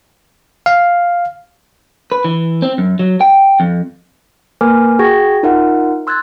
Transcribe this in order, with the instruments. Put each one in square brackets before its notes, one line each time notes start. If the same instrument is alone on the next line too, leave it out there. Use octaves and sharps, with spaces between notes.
[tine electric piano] F5
[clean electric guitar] B4
E3
C4
F#2
F#3
G5
F2
[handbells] A#3 A#4 B4 G#5 D6 F6
F#4 G#4 G5 C#6 G#6 A#6
D#4 F4 A#4 E5 F#5
C6 E6 F#6 G#6 A6